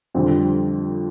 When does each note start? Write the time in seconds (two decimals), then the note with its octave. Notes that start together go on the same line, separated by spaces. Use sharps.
0.14 F2 D3 G3 C4